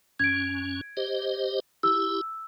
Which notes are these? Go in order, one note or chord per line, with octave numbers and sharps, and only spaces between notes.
F#2 C#4 G#6 D7
G4 C5 D#5
E4 G4 E6